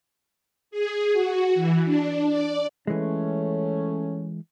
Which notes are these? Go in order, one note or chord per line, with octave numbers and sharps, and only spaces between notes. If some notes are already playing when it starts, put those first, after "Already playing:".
G#4
F#4
E3
D4
D5
E3 G#3 A3 C#4